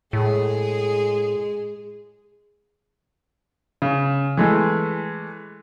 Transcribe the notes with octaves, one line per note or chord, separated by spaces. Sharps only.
A2 G#3 G#4
C#3
E3 G#3 A3